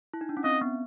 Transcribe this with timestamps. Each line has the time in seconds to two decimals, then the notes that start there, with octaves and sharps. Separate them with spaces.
0.14 E4
0.21 D#4
0.29 D4
0.37 C#4
0.44 C4 D#5
0.61 B3